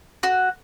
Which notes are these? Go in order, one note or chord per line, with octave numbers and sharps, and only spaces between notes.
F#4